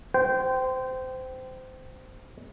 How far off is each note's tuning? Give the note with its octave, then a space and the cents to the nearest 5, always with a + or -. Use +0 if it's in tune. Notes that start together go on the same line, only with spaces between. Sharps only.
C5 -20 G5 -15